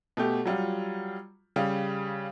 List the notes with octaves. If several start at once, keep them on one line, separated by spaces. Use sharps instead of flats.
B2 A3 G4
F#3 G3 F4
C#3 G3 F5